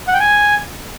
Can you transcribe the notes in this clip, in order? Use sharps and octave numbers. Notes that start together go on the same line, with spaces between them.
F#5
G5
G#5